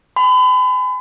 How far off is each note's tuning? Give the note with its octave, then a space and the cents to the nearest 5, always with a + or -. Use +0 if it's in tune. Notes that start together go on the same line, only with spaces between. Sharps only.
G#5 +0 B5 +40